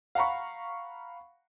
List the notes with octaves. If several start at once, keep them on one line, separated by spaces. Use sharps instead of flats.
F5 F#5 A#5 B5 C#6